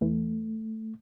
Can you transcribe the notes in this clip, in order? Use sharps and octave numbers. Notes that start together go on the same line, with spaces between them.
E2 E3 A3